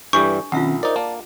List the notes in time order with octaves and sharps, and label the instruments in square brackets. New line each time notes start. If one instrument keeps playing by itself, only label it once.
[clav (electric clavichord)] G2 E3 G3 [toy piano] D4 A4 [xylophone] C#6
[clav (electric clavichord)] B1 [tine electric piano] D#3 C4 C#4 [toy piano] F4 E5 F#5
[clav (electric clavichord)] D#4 D5 [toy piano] G#4 [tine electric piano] A#4 C5 E5
[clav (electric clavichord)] A#3 [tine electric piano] D5 A5